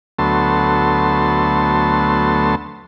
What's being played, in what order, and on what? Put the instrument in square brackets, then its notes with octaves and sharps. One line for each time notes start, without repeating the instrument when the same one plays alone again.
[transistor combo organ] D2 F#3 A3 B3 A5 C6